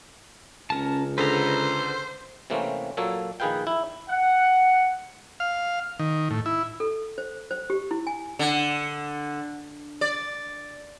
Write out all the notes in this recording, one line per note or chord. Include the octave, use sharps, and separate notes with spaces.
C#2 C#4 A#4 A5
D3 G#4 A4 B4 C5 A#5
C3 E3 A3 A#3 C4 C#4
A#2 F#3 A#3 A4 C#5
A#1 D#3 G#4 B4 F5 G5
E4
F#5
F5
D#3
A2
E4
A4
C5
C5
G4
E4
G#5
D3
D5